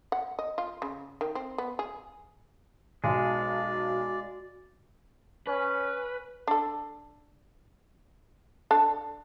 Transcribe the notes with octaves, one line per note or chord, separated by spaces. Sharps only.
F#5
D#5
F4
C#3
D#3
C4
B3
G#4
B1 G#3 F#4 D5
C#4 B4
D4 A4
D4 A4 A5